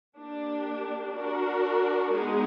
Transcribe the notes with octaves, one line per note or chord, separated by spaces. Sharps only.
A#3 D4 G4
D4 F#4 A#4
G#3 B3 D#4 G#4